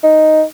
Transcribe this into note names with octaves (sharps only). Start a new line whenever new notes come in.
D#4